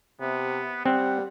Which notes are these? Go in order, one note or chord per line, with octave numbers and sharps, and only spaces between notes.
C3 B3
G3 C4 F#5